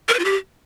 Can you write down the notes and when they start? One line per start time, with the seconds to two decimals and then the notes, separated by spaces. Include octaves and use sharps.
0.09 A#4
0.14 B4
0.19 F4
0.25 G4